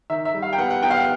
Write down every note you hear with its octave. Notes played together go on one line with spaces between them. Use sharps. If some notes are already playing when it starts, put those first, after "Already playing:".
D#3 E5
E5
G3
F5
G5
B3 F#5
F#5
B3 G5
F5
F#5